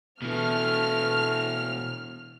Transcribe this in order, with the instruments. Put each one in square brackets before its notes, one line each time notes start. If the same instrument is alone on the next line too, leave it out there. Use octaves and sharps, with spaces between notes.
[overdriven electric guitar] B2 E3 [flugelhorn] A3 [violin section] F6